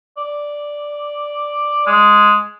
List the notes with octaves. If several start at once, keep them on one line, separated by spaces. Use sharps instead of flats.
D5
G#3